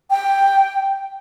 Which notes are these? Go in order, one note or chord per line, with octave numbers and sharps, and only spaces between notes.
G5